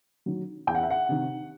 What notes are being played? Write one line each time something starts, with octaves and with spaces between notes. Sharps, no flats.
D#3 F#3
E2 G5
F#5
E5
F#5
C3 D#3